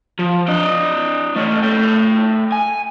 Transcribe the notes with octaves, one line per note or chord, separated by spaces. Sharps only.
F3
D4 D#5
A3 C#4
A3 G5
G#5